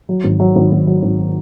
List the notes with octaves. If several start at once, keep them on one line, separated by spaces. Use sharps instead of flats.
F#3
G#1
F#3
G#1
G#1
F#3
G#1